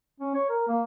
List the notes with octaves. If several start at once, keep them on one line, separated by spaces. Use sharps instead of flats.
C#4
C#5
A#4
A#3